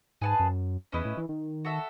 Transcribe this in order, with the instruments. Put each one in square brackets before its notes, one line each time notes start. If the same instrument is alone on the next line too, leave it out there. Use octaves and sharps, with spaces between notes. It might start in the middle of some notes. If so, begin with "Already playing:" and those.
[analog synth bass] G#2 [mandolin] G#4 B4 F#5 A5
[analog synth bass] F#2
[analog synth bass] E2 [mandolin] C#4 E4 B4 D#5
[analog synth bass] A2
E3
D#3
[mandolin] F#4 A4 E5